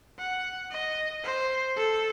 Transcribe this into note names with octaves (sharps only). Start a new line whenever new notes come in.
F#5
D#5
C5
A4